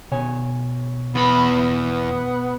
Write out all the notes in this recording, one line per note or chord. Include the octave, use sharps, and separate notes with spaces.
B2 C#5 G#5
E2 B3 B5